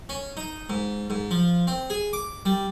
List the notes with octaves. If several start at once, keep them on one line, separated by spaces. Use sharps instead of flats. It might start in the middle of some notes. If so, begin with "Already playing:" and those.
C#4
D#4
G#2
G#2
F3
C4
G#4
D6
G3